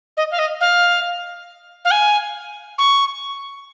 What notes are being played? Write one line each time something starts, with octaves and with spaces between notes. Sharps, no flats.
D#5
F5
D#5
F5
F5
G#5
C#6